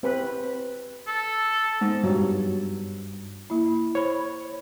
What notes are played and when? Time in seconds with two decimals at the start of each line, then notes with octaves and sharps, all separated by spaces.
0.03 C4 B4 B5
1.08 A4
1.81 G#2 B3
2.04 G2 F#3 C#5
3.50 A#3 E4
3.95 C5 C#5 B5